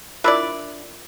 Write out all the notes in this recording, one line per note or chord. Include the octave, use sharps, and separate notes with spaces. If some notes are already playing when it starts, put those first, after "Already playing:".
D4 E4 F4 A#4 D5 E6